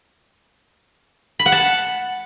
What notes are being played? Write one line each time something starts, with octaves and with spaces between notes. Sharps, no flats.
B5
F#5
A5